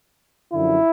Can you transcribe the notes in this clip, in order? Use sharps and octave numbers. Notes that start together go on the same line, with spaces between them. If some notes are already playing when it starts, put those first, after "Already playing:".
F#2 D3 F3 E4